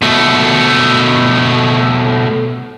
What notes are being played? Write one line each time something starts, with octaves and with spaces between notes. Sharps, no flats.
B2 A3